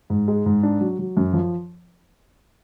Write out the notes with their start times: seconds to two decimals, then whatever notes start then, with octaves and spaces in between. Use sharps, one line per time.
0.10 G#2
0.28 G#3
0.46 G#2
0.63 D4
0.81 F#3
0.99 F#3
1.17 F#2
1.33 F3